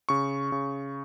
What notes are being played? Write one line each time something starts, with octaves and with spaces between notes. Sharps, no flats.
C#3 C#6
C#3